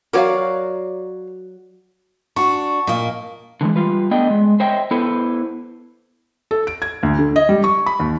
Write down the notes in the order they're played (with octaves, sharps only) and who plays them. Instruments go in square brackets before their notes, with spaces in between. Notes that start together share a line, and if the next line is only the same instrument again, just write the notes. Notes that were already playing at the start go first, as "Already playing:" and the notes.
[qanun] F#3 F#4 D5 [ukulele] A#4 C#5 F5
[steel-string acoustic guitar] D4 F#4 [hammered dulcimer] C#6
[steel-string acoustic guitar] A#2 A#3 [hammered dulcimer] D#5
[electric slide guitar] D3 E3 F3 G#3
G3 F4 B4
A3 B3 D4 D#5 G5
G#3
C5 C#5 D#5 E5 G5
B3 E4 A4 B4 C5
[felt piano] A4
D7
G#6
D2
D3
D#5
G3
C#6
B5
D#2